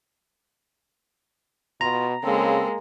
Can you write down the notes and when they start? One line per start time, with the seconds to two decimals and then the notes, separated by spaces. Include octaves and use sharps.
1.81 B2 F4 A#5
2.23 C#3 G#3 A#3 C4 A4